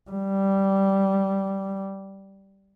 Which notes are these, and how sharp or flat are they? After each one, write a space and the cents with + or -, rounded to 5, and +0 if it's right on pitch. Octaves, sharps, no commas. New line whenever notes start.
G3 -10